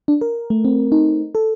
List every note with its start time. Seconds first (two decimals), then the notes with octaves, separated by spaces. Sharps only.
0.08 D4
0.21 A#4
0.50 A3
0.65 C4
0.92 D#4
1.35 A4